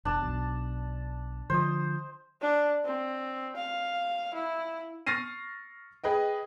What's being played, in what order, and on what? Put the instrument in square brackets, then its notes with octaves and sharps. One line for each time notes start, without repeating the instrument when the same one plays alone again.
[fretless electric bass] E1 E2 [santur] D4 A5
[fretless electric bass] B1 B2
[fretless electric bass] D3 F3 [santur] C5 D#5
[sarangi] D4
C4
F5
E4
[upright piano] C#6 F6 A6 A#6 C7 D#7
G#4 B4 D#5 G5